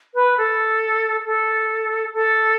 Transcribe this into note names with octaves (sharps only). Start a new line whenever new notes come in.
B4
A4
A4
A4